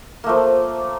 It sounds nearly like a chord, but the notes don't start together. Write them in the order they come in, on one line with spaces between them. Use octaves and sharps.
A#3 A3 F3